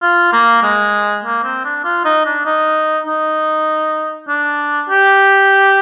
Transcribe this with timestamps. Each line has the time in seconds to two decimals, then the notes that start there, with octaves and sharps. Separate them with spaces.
0.02 F4
0.33 A#3
0.63 G#3
1.24 A#3
1.44 C4
1.65 D4
1.84 F4
2.05 D#4
2.26 D4
2.46 D#4
3.07 D#4
4.28 D4
4.90 G4